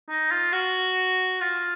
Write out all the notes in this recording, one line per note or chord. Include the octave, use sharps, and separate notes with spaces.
D#4
F4
F#4
F4